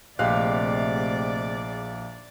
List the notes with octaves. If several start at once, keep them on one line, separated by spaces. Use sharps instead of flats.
A#1 C3 G#3 A3 G4 D5 F5 F#6